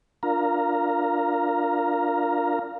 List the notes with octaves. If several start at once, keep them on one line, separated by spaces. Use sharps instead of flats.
D4 F4 A#4 F5 A#5